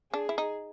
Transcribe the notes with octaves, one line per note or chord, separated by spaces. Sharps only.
D4 G#4
E4
D#4